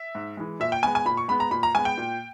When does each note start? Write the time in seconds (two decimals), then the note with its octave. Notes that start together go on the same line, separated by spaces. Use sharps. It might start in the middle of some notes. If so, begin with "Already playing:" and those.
Already playing: E5
0.15 G#2
0.37 E3 G#3
0.60 A#2 E5
0.72 G5
0.83 G#3 B3 G#5
0.95 G#5
1.05 A#2 B5
1.17 C#6
1.28 G#3 B3 B5
1.40 A#5
1.51 A#2 B5
1.63 A#5
1.75 G#3 B3 G#5
1.85 G5
1.97 A#2